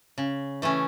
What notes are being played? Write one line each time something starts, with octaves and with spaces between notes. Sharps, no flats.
C#3
E3 A3 C#4